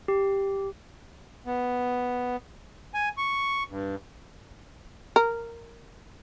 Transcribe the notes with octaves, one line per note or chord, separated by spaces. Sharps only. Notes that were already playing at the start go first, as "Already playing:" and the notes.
G4
B3
G#5
C#6
G2
A#4